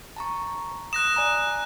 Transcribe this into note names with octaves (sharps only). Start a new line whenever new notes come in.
A5 A#5 C#6
D#6 F#6 A#6 E7
D5 G#5 A#5